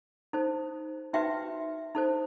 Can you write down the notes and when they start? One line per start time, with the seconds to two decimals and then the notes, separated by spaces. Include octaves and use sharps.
0.33 D#4 A4 C5
1.14 D#4 F#4 B4 E5 G5
1.95 D#4 A4 C5